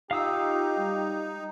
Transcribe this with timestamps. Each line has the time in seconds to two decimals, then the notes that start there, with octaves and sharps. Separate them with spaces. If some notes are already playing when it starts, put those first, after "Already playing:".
0.11 D#4 F4 G4 F5 D#6 E6
0.77 G3